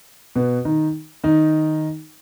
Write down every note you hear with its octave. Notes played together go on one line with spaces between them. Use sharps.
B2 B3
D#3 D#4
D#3 D#4